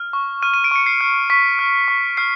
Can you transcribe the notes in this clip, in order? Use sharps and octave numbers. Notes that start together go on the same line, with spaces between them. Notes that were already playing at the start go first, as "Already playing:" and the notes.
Already playing: F6
C#6
F6 D#7
D#7
D7
C#6 C#7
C7
F6
C#6 B6
F6
C#6
F6 C7